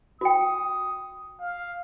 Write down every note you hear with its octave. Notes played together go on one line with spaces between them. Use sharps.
F#4 G5 D#6
F5